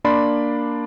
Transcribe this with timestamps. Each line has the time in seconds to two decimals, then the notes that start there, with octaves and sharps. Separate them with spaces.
0.04 A#3 D4 D5 B5 C6